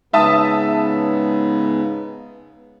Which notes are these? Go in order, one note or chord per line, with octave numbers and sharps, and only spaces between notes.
G#2 C#3 B3 E5 A5 D#6